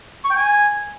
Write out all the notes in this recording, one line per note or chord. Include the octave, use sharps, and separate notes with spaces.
C#6
G5
G#5